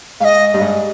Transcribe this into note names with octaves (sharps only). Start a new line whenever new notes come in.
G#2 D#5 F5
G2
G#2